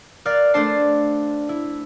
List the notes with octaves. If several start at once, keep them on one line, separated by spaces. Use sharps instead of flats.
A#4 D5 F5 F6 F#6 A6
A3 D4 C5 D5 A5 C7
E4